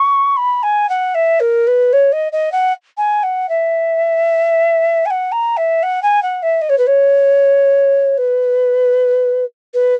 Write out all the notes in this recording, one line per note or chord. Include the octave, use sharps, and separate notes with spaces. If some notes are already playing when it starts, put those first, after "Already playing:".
Already playing: C#6
B5
G#5
F#5
E5
A#4
B4
C#5
D#5
D#5
F#5
G#5
F#5
E5
G#5
F#5
A#5
E5
F#5
G#5
F#5
E5
D#5
C#5
B4
C#5
B4
B4